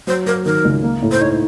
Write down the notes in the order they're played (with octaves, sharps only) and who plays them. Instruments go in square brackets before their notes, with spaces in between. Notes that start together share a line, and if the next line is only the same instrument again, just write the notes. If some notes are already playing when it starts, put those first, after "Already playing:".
[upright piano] F#3 [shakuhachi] C5
[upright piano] F#3 [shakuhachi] A#4
[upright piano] D#3 [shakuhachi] A#4
[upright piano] C#2
A#3
A2
[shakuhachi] C5
[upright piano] D#4 [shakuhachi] C#5